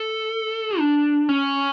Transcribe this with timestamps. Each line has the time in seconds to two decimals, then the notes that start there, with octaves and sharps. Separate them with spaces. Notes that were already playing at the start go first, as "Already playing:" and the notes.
Already playing: A4
0.78 D4
1.29 C#4